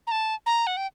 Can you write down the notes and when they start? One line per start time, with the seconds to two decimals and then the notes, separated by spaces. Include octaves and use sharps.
0.07 A#5
0.11 A5
0.46 A#5
0.67 F#5
0.77 G5